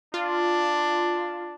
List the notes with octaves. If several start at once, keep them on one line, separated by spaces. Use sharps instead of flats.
D4 F4